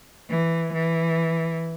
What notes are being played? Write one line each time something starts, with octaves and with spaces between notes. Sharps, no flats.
E3
E3